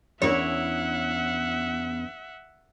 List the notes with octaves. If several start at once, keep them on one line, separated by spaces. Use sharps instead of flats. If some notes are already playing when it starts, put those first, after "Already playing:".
E2 C#4 D4 E4 A#4 C#5 E5 F#5